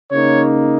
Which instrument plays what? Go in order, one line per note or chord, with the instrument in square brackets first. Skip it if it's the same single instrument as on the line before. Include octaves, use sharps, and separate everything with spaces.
[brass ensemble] C#3 A#3 D#4 C#5